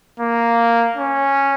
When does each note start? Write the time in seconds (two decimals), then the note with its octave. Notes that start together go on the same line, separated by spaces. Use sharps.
0.20 A#3
0.97 C#4